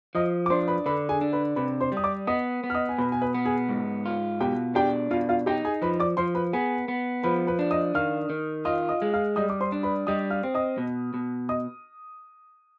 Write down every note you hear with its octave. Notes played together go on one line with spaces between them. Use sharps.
F3 D#5 D#6
D6
D4 C5 C6
B4 B5
D3 B4 B5
G#4 G#5
D4
B4 B5
C3 B4 B5
C5 C6
G3
D#6
D5 D6
B3 D#5 D#6
B3
F6
D#5 D#6
G#5
B2 B4 B5
G#5
B4 B5
B3
G#4 G#5
G#2
F4
B2 G4 G5
D4 G4 G5
B2 F4 F5
F4 F5
D#4 G4 G5
G#4 G#5
F3 B4 B5
D5 D6
F3 C5 C6
B4 B5
B3 G#4 G#5
B3
F3 B4 B5
B4 B5
D4
D#5 D#6
D#3 F5 F6
D#3
F4 D#5 D#6
D#5 D#6
G#3
F5 F6
G3 D#5 D#6
D6
C5 C6
D4
B4 B5
G3 D#5 D#6
F5 F6
C4
D#5 D#6
B2
B2
D#5 D#6